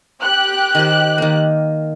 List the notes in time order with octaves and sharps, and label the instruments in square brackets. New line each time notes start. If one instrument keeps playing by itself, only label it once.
[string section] G4 F#6
[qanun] D#3 C5
D#3 A#3